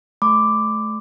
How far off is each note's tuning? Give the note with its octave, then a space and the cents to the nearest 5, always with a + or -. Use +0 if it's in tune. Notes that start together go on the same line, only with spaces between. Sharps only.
A3 -35 B5 +40 D6 +0